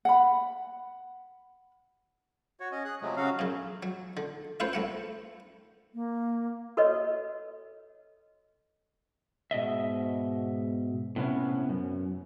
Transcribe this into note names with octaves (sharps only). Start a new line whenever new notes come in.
F#5 B5
F#4 C#5
C#4 D#5
G#4 F#6
C3 F3 F#3 G#3 A3
C#3 F#3 C#4 F#4 F5
F#2 C#3
F#3
D3
A3 C#4 E4 F4 B4 C5
C2 A3 F#5
A#3
F#4 A4 B4 C#5 D#5
G#2 B2 D#5 E5
A2 C3 B3 C#4
F#2